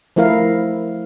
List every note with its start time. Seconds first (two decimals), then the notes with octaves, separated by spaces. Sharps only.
0.16 F3 A3 E4 A#4 F5